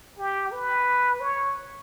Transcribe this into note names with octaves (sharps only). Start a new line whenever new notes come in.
G4
B4
C#5